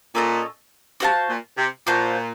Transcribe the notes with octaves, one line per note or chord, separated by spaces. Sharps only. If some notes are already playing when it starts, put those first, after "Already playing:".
A#2 C#4 A4 D#5
C3 F#4 C5 F5 A5
A#2
C3
A#2 F#4 C5 F5 A5